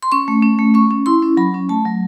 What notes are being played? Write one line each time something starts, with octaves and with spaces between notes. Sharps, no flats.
C6
C#4 C#6
A3
C#4
A3
C#4 C#6
C#4
E4 C6
C#4
F#3 B5
C#4
A3 A5
F#3